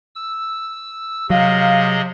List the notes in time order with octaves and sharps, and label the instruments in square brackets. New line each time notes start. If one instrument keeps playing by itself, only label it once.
[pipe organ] E6
[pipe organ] C3 G#4 D#5 [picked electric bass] F#3 [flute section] F5